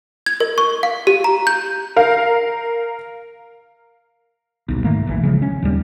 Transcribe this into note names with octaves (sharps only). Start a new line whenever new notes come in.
G#6
A#4
C#6
F5
G4
A#5
G6
A#4 F5
D#1 B1
G#2 D#3 A3 A#3
F1 A#1 E3
C#3 F3 G#3
C#4
D#1 D#2 G3